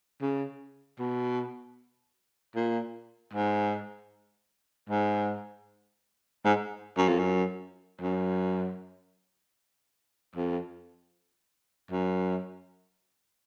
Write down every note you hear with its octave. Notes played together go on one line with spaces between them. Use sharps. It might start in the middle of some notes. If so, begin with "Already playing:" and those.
C#3
B2
A#2
G#2
G#2
G#2
F#2
F2
F#2
F#2
F2
F#2